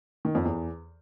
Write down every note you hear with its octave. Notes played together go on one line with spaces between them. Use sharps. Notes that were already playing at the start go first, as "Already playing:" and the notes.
D#3
F2
E2